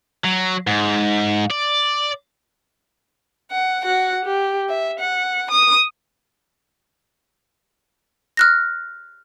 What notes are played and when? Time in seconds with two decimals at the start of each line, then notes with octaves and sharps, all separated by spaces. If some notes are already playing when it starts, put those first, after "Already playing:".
0.25 F#3
0.67 G#2
1.50 D5
3.51 F#5
3.84 F#4 F#5
4.25 G4
4.69 E5
4.99 F#5
5.51 D#6
8.37 F6 F#6 A#6